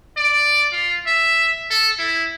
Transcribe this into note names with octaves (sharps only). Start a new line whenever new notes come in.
D5
F4
E5
A4
E4